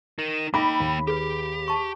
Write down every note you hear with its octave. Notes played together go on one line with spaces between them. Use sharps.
D#4 A#4
A#3 D#4 G5 B5 D6 A#6
D#2
G4 G#4 B4
A5 C#6